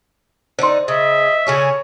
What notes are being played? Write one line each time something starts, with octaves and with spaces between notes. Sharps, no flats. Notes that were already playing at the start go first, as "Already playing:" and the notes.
D3 D#4 C5 C6
C#3 D#5 E5
C#3 G#4 A4 C#5